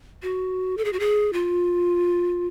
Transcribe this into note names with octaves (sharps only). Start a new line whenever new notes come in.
F#4
A4
G#4
F#4
G#4
F4